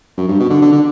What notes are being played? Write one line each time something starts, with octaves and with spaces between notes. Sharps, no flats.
F#2
G2
B2
D3
D3
D3